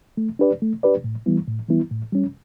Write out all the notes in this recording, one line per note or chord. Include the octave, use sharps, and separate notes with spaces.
A3
D4 G4 B4 D5
A3
D4 G4 B4 D5
A2
E3 G3 B3 E4
A2
E3 G3 B3 E4
A2
G3 C#4